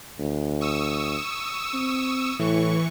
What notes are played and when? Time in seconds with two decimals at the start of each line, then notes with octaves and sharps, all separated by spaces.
0.19 D2
0.61 C#6 D#6 E6
1.74 C4
2.39 A2 E3 C#6